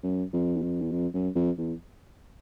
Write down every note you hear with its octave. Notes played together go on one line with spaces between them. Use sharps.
F#2
F2
E2
F2
E2
F2
F#2
F2
E2